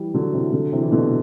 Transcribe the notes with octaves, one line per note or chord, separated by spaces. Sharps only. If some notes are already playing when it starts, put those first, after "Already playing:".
Already playing: E3 G3
D3 F#3
C3 E3
D3 F#3
C3 E3
E3
B2 D3